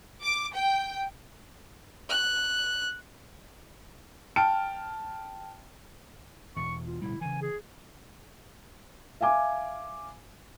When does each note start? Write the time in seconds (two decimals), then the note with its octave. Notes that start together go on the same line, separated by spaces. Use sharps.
0.23 D6
0.54 G5
2.09 F#6
4.36 G5 A5 F6 D7
6.56 E2 B2 C#6
6.85 F4
7.02 D1 B2 G3 E4
7.21 C#3 E3 G#5
7.42 G#4
9.21 E5 F5 G#5 D6